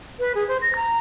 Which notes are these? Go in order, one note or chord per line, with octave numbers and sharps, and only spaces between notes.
B4
G#4
C5
A#6
A#5